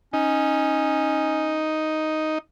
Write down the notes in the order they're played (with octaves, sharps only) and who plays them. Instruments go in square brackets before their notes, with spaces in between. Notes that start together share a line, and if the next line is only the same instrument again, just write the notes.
[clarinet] C#4 [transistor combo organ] D#4